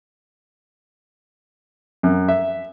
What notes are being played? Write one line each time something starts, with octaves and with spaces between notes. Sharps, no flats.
F#2
E5